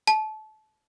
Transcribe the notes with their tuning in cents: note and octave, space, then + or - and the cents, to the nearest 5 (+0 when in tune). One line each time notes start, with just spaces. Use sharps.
A5 -25